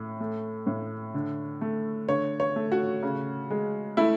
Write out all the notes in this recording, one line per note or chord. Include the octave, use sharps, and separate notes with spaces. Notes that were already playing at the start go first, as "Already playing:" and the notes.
Already playing: A2
A3
A2
D3
A3
D3 C#5
C#5
A3
F#4
C#3
G#3
A3 E4